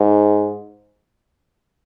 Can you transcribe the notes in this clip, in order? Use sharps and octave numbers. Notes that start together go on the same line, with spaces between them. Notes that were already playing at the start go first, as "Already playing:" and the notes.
Already playing: G#2